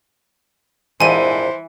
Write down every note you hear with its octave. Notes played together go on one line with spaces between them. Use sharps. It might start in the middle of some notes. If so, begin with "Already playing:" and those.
A#1 F2 G#2 E3 C5 G#5 D#7